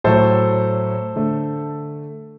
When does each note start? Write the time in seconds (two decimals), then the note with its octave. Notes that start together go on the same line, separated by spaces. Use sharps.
0.04 A2 F#3 A3 A4 C5
1.16 D3 A3